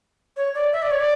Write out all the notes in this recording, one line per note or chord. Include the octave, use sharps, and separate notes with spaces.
C#5
D5
E5
D5
C#5
D5